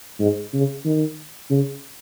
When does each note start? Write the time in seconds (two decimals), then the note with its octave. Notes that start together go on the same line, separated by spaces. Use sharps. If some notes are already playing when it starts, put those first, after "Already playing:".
0.20 G#2
0.53 C#3
0.85 D#3
1.50 C#3